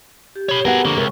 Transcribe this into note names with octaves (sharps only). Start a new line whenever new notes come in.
G4
C#5 B5
B3 F#4 G#4 A#4 F#5
F2 D3 A#3 C#6
C#2 C3 A#4